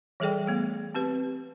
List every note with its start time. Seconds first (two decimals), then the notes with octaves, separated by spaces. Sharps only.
0.20 E3 G3 G#4 A4 D5 G5
0.47 A3 B3
0.95 C4 G4 B4